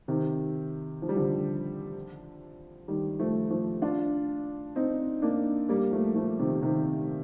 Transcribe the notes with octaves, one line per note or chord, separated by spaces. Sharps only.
C3 D#3
F3
G3
D3 F3
D#3 G3
F3 A3
F3 A3
D4 F4
C4 D#4
A#3 D4
G3 A#3
F3 A3
F3 A3
C3 D#3
C3 D#3